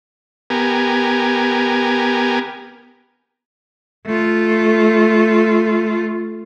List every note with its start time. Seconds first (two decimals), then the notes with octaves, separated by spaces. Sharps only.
0.50 B3 G4 A#4 G#5
4.06 A3 F4